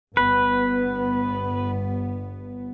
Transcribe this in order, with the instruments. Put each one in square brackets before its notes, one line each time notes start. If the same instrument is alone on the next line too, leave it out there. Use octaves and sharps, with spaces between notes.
[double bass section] G1 B3 [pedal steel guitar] B4